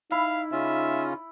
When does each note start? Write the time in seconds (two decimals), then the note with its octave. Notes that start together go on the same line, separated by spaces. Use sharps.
0.12 D#4 E4 F5
0.52 C#3 C#4 F4 E5